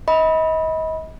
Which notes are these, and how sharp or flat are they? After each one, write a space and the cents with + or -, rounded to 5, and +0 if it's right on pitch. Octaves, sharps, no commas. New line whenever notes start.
D#5 +35 B5 -15